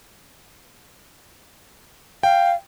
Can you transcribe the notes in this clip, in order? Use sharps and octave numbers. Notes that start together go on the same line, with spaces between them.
F5 G5